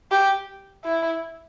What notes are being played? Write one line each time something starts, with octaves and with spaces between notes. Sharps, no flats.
G4
E4